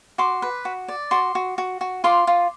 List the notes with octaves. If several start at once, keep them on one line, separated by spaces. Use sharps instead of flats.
F#4 C6 D6
B4
F#4
D5
F#4 C6 D6
F#4
F#4
F#4
F4 C6 D6
F4